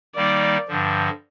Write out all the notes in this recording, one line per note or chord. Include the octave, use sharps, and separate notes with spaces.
D#3 G3 A#3 D#4 D5
G2 D3 F3